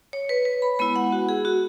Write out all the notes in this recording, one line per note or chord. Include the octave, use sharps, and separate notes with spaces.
C#5
B4
B4
B5
G#3 B3 E4 B5
F#5
F#4
G#4
F#4